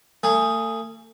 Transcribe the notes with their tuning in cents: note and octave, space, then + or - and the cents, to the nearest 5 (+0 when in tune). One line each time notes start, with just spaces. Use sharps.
A3 +40 G#4 +0